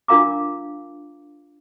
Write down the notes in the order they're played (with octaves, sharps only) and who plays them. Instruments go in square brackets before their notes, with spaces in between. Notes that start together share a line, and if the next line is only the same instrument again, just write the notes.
[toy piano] D4 F4 A#4 F5 A#5 D6